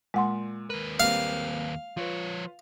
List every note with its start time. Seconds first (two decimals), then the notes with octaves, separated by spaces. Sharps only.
0.14 A#2 G#3 F#5 C6
0.70 D#2 A#4 B4
1.00 G3 A#3 C4 F5
1.97 F3 F4 B4 C#5